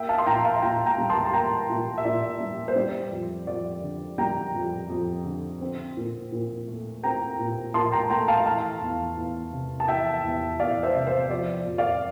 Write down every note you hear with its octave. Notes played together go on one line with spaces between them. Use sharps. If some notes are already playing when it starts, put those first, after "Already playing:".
Already playing: A#3 E5 G5
F5 A5
C6
A#2 G5 A#5
F5 A5
A#2 G5 A#5
G5 A#5
G3
A5 C6
A5
A#3 G5 A#5
A#2
E5
A#2 D5
G3
C5
G3 D5
F2
F2 D5
D3
G3 G5 A#5
F2
F2
D3
C4
A#2
A#2
A3
C4 G5 A#5
A#2
A#2 A5 C6
G5 A#5
A3 G5 A#5
F5 A5
E3 F5 A5
E2
E2
C3
A5
E3 E5 G5
E2
E2 D5 F5
C5 E5
C3
C5
F3 D5
F2
D5 F5